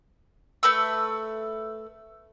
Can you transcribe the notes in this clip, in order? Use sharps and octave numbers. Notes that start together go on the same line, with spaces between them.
A3 B4 E6